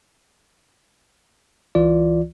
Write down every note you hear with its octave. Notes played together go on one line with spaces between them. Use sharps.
C#2 E3 F4 D5